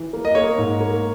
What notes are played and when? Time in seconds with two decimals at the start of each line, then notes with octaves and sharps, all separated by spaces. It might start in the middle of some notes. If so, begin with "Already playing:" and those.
Already playing: E3
0.13 A#3
0.25 D#5
0.35 A#3 C#5
0.58 G#2
0.80 A#3